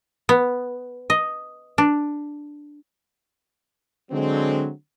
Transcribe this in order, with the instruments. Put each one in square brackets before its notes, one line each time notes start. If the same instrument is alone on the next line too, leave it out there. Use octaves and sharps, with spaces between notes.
[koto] B3
D#5
D4
[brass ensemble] D3 F#3 G#3 C4